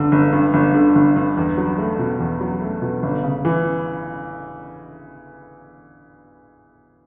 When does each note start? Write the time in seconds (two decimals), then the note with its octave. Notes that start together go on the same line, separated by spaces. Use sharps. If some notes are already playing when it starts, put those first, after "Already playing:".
Already playing: G1 D3
0.12 G1
0.33 G2
0.54 G1
0.74 D3
0.95 G1
1.16 G2
1.37 E2
1.57 F#3
1.78 A3
1.99 B2
2.20 E2
2.41 F#3
2.61 A3
2.82 B2
3.03 G1
3.24 C#3
3.45 E3